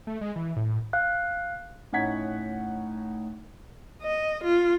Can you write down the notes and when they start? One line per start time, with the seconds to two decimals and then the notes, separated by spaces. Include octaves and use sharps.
0.07 A3
0.21 G#3
0.36 E3
0.56 A2
0.93 F5 F#6
1.93 A2 C#4 D#4 F#5 G#6 B6
4.02 D#5
4.44 F4